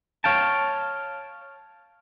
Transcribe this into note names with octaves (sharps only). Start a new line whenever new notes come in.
C#5 F5 G5 A5